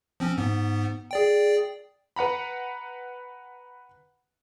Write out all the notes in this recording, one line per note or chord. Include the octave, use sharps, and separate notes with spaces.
F3 C4 C#4
G#2 B3
G#4 D5 G5
B4 F#5 A#5 B5